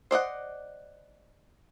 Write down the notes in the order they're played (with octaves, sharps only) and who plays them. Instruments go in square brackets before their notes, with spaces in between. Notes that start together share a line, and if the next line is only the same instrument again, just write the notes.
[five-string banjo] C5 D5 D#5 F#5